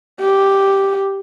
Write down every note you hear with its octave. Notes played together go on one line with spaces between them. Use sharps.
G4